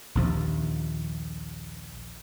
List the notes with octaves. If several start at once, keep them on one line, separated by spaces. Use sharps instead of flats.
A#1 D#2 F3